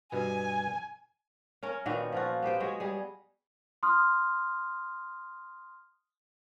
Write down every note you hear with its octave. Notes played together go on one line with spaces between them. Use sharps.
G2 B2 B3 G#5
C#4 A#4 C#5
A#2 D#3 B3 F#4
F3 F4 F#4
B3 G4 C5 G5
F#3 G#3 C#5
G3 G#4
C6 D#6 F6